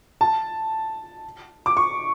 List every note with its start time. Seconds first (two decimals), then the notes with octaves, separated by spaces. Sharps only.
0.21 A5
1.66 D6
1.77 C#6